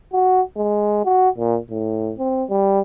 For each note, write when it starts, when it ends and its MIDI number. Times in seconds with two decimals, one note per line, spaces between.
0.13 0.42 66
0.57 1.01 56
1.05 1.29 66
1.38 1.58 46
1.70 2.13 45
2.19 2.44 60
2.49 2.81 55